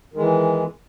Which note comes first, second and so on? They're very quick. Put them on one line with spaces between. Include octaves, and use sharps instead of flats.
D#3 G#3 E3